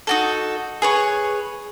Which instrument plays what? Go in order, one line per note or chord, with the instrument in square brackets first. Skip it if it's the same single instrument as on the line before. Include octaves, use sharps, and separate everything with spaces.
[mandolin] D#4 F#4 A4
G#4 B4 C#5